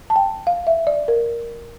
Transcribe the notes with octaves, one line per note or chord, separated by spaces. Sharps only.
A5
G5
F5
E5
D5
A#4